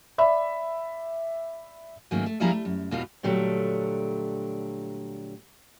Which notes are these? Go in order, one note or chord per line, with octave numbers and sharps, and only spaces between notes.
D5 E5 B5
G#2 D#3 F#3 A3 A#3 C#4
A3
F3 G3 A#3 E4 G#4 A#5
A3
F#2
E2 B2 E3 C4 F4 F5
A#2 D3 F#3 G3 A3